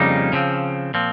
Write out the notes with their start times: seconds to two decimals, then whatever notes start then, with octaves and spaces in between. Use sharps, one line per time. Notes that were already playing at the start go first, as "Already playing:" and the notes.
Already playing: F2 C#3 G3 A#3 D#4
0.33 C#3 F3 C4
0.94 A#2 F3 C4